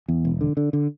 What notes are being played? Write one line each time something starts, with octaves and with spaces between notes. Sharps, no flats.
E2
E1
D3
D3
D3